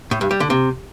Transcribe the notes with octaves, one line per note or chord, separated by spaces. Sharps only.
A2
G2
G3
D3
C3